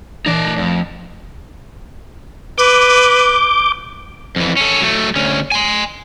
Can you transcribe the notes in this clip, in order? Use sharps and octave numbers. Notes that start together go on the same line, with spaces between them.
A#2 E3 D#4 A#4 D5
A3
F2 A3
B4 D6 G6
F2 E3
C#4 A4
F#3 A3
D2 C#4
G#5 C6